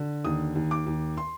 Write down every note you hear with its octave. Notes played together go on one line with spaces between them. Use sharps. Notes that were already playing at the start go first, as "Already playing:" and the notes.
Already playing: D3
D#2 D#6
D#2
D6
D#2
C6